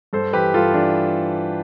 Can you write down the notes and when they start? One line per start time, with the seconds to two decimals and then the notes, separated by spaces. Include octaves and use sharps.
0.13 G2 A4 C5
0.33 E3 G4 B4
0.54 G2 F4 A4
0.73 E3 D4